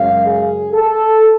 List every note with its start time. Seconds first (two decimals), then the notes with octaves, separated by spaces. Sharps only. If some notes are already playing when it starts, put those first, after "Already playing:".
Already playing: F#2 C#3 G#3 F5
0.26 G#4
0.72 A4